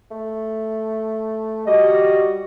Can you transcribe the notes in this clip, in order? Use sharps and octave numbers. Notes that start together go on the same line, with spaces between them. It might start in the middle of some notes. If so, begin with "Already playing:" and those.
A3
G3 F#4 G4 D#5